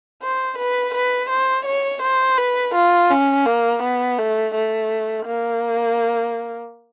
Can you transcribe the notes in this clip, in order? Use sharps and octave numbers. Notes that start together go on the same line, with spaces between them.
C5
B4
B4
C5
C#5
C5
B4
F4
C#4
A#3
B3
A3
A3
A#3